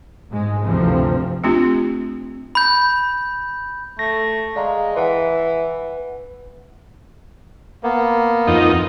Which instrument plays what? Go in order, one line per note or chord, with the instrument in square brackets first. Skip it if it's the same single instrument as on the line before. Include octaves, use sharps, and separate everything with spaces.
[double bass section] G1 G#2 G#3
G1 D2 C3 E3 F3 C4
[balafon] A3 C4 D4 F4 G4
[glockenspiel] B5 G6
[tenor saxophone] A3 [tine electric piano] A#6
[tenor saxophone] G#3 [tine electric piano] D5 F5 A#5
[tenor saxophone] E3 [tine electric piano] B4 F#5
[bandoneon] A#3 B3
[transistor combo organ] F2 D#4